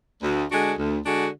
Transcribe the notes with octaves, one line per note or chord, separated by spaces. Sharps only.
D2
D3 G#3 D4 F#4
D2
D3 G#3 D4 F#4